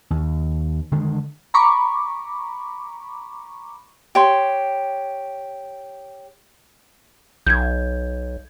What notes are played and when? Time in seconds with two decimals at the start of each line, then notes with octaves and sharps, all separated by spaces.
0.10 D#2
0.92 D3 D#3 G#3
1.54 A#5 B5 C#6 D6
4.15 G4 C#5 C6
7.47 B1 G6 G#6